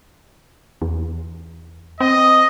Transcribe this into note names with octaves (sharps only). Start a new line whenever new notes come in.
E2
C4 D#5